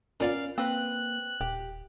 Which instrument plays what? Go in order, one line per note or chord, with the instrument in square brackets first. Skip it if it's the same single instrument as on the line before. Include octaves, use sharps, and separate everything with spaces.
[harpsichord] A#2 B3 F4 [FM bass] C#4 [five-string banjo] A#4 D5 [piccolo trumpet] F5
[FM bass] A#3 [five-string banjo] C4 B4 [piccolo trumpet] F#6
[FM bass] D#1 [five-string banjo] G4